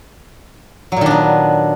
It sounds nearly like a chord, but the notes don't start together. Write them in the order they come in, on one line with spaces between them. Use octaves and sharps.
F#3 A#2 D#3 D4 B3